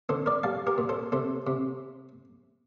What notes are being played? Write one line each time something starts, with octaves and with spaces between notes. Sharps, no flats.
D3 A4 C5
A#4 D5
G3 F5 A5
G4 A#4
A#2
A4 C5
C3 A4 C5
C3